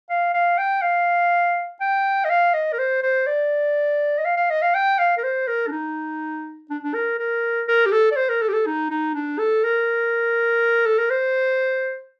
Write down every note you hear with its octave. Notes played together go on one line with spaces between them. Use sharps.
F5
F5
G5
F5
G5
D#5
F5
D#5
A#4
C5
C5
D5
D#5
F5
F5
D#5
F5
G5
F5
A#4
C5
A#4
D4
D#4
D4
D4
A#4
A#4
A#4
G4
A4
D5
C5
A#4
A4
G4
A4
D#4
D#4
D4
A4
A#4
A4
A#4
C5